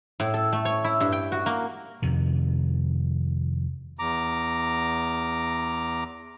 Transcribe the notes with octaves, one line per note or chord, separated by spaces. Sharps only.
A2
A4
A3
C#5
E4
G2
G5
F#4
A#3
F2 C3 D#3
E2 A#5 D6